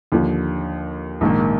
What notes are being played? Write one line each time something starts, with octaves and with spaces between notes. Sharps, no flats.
D#2 D3 F3
A#1 G#2 D#3 A#3